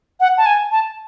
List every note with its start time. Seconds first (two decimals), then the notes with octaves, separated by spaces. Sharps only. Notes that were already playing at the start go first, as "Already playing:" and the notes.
0.20 F#5
0.37 A5
0.46 G#5
0.71 A5